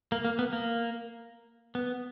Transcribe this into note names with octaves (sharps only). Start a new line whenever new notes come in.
A#3
A#3
B3
A#3
B3